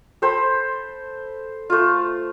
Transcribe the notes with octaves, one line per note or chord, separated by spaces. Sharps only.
A4 C5 B5
A3 F4